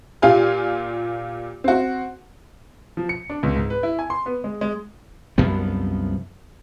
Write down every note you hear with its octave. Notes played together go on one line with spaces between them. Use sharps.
A#2 F4 G4 F5 G#5
C4 F#4
F3
C#7
D4
C#2
G#2
B4
E4
G#5
C6
B3
G#3
G#3
C2 F#2 F3 B3